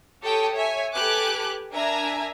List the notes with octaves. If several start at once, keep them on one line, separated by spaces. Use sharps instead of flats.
G4 A4 C#5 G5 A5 D#6
C#5 E5 G#5
G4 A4 B4 G#5 D6 F#6
D4 A#4 E5 G#5 A#5